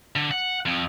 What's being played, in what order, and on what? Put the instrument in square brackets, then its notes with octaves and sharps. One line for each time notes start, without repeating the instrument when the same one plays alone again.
[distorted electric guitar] D3
F#5
F2